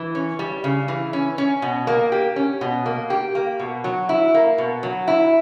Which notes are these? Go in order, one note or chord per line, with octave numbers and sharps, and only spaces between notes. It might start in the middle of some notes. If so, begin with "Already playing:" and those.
Already playing: E3
C#4
G3
C#3
E3
C#4
C#4
B2
A#3
G4
C#4
B2
A#3
G4
A#3
B2
F#3
E4
A#3
B2
F#3
E4